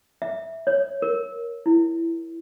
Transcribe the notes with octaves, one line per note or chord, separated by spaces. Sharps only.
E5
C#5
A#4
E4